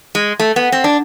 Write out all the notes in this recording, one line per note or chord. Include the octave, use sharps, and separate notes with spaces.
G#3
A3
B3
C4
D4